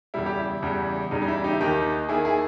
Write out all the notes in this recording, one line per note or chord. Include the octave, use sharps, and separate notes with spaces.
E2 C#3 G3 E4
G4
E4
E2 C#3 G3
E2 C#3 G3 D#4
D#4
E4
D#4 G4
E4
D#2 D#3 A#3 D#4 G4
D#2 D#3 A#3 E4 G#4
E4 G#4